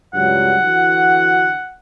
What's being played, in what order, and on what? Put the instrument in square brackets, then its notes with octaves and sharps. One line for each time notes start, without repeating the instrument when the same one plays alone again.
[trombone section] C#2 G2 F#3 [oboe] F#5
[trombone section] D3 E3 F#4